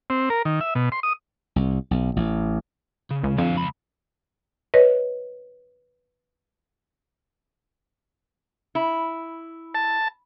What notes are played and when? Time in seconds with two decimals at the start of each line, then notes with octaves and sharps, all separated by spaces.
0.10 C4
0.30 A#4
0.45 D#3
0.61 E5
0.75 B2
0.92 C6
1.03 D#6
1.56 C2
1.91 B1
2.16 A1
3.11 C#3
3.24 C#2
3.38 F2 D3 F5
3.57 C#2 B5
4.74 B4 C#5 D#5 A#6
8.75 E4
9.75 A5